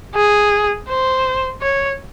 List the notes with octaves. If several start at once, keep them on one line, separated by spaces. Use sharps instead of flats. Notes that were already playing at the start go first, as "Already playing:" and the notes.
G#4
C5
C#5